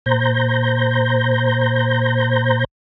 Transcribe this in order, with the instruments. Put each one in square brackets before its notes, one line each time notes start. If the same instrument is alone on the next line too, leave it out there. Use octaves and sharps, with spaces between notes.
[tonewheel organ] A#2 C5 A#5 G6